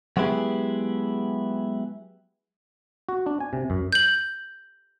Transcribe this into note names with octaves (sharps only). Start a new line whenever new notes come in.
F#3 G#3 B3 E4 G4 G#4
F#4
D4
G#5
C3
F#2
G6 F#7